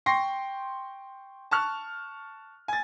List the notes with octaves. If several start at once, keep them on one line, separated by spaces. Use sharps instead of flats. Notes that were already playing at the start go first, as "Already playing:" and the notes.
G5 C6 C#6 A#6 C7
A5 C#6 F6 F#6
G#5 A6